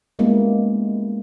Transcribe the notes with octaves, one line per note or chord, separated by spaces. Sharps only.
G3 G#3 A#3 B3 C#4 E4